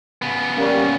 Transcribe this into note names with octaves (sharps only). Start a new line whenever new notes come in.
C#3 B3
G3 A#3 C#4